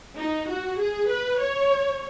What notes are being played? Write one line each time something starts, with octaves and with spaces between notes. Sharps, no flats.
D#4
F#4
G#4
B4
C#5